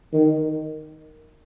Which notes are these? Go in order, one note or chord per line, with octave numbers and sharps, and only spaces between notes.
D#3